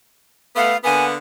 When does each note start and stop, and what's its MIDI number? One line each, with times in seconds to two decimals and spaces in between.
0.56 0.74 57
0.56 0.74 59
0.56 0.77 77
0.84 1.15 50
0.84 1.15 58
0.84 1.15 59
0.84 1.05 80